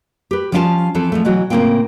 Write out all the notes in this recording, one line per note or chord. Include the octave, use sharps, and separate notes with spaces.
G4 B4
F3 G3 C#4 E4 F4 A5
E3 F3 C4 A4
F3 G#3 A3
B2 E3 F#3 F#4
A2 C#3 A#3 C4 F4 G5